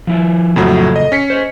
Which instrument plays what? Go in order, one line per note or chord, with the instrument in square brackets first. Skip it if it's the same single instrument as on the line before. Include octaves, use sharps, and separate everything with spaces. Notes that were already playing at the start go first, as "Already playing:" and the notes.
[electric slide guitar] F3 E4 F4
[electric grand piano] F2 A2 F#3 [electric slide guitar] C#3 F4 A4
[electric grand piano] D#5
C#4 B6 C#7
[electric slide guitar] C5 D#5